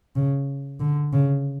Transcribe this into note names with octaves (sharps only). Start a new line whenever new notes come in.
C#3
D3
C#3